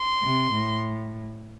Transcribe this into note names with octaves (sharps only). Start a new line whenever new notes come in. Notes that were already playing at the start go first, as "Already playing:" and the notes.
Already playing: C6
C3
A2